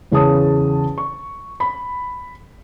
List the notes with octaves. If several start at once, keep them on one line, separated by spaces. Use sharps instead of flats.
E2 C#3 G#4 C#5 A5 D#6
C#6
B5